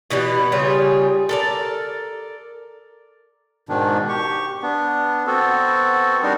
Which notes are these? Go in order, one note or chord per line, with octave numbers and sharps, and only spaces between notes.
B2 E3 G3 B3
C#3 G3 F4 G#4
A4 A#4 D5
G#2 B2 D#3 D4
G4 C#6
B3 D4
B3 C4 F#4 A4
G3 D4 D#4 F#4 A#4